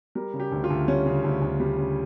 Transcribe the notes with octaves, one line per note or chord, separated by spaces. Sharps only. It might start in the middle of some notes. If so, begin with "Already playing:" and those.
G3 A#4
C#3
G4
D2
F4
D2
G3 C#4
C#3
D2
D2
G3
C#3